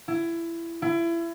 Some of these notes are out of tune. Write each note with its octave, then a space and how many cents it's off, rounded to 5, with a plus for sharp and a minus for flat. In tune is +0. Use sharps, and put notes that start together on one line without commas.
E4 +20
E4 +30